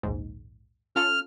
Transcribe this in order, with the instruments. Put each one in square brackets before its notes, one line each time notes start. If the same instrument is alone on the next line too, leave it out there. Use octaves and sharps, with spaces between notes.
[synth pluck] A#1 D#2 G#2
[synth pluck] C#4 F4 A4 [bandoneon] F6